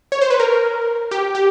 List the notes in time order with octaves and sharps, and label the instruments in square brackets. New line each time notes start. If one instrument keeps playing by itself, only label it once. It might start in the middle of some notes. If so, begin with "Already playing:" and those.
[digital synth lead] C#5
C5
B4
A#4
G4
G4